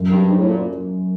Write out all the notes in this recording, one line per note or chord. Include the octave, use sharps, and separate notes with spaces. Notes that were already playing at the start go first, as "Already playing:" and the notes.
Already playing: F#2 F#3
G2
G#2
A2
A#2